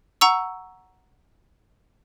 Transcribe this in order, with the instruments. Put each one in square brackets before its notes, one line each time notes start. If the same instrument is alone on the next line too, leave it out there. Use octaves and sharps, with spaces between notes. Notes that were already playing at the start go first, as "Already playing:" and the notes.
[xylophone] F#5 A#5 C#6 E6